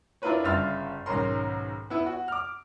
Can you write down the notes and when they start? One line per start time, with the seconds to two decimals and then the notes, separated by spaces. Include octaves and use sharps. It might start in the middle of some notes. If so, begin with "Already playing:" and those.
0.22 D4 E4 F4 A#4 B4 C#5
0.44 G1 C#3 E5 C6 F6 A6
1.06 B1 G#2 D#3 C#4 A#4 C6
1.90 B3 E4
2.06 F#4
2.28 D6 F6